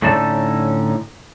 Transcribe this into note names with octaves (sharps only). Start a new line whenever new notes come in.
A2 D3 C#4 D#4 D5 A5